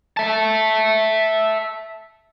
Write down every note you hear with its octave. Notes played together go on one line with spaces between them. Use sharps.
E5 A5